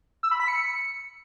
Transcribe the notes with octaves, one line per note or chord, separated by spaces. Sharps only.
E6
B5
B6
C#7